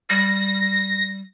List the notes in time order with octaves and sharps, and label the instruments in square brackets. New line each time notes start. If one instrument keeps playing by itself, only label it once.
[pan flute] G3 [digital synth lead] A#6